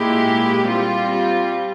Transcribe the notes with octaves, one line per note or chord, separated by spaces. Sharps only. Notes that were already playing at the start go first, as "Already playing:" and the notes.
Already playing: A#2 G#3 E4 G4
G3 C4 F4